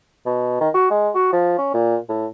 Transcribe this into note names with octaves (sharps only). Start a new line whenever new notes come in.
B2
D#3
F#4
G#3
F#4
F3
C#4
A#2
A2